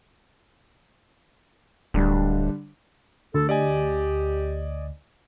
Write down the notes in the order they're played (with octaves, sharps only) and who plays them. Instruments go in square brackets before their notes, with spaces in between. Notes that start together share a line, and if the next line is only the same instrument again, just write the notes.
[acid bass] D1 [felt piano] D3 G3 D4
[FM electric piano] D2 [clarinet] A4
[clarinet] G4 [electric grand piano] D5 D#5 G#5